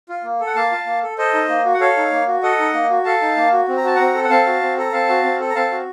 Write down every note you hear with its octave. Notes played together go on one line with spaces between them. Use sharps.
F4
A#3
A4
F#5
A#3 F5 A5
F4
A#3
A4
A4 C5 D#5
D#4
A#3
F#4
F#5
A4 C#5 F5
D#4
A#3
F#4
A4 D#5 F#5
D#4
A#3
F#4
A4 F5 A5
D#4
A#3
F#4
C4
A#5
F#4 A5
C4 F#5 A#5
A4
F#5
C4 F5 A5
F#4
C4
A4 A#5
C4 F5 A5
F#4
C4
A4
A#5
C4 F5 A5
F#4